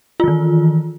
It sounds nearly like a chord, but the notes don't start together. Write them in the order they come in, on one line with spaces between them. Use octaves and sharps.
F4 E3 D#3